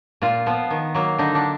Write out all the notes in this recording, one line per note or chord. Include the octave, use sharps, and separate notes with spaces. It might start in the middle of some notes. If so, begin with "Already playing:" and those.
A#2 F4
F3 B3
D#3
F#3 A#3
D3 D#4
D4